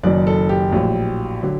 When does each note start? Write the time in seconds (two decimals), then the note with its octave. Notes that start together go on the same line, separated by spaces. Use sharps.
0.03 F#1 F#2 D#3 F#3 D5
0.27 A4
0.49 G4
0.72 A#1 A2 F#3
1.43 D3 F#3